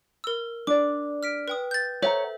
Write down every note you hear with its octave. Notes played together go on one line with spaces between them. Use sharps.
A#4 E6
D4 D5 D6
F6 B6 D7
B4 G5 D#6
G6 A6
A4 C5 C#5 E5 F#5 A#5